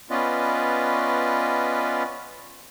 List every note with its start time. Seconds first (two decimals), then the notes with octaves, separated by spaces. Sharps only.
0.10 B3 C#4 F4 B4 D5 D#5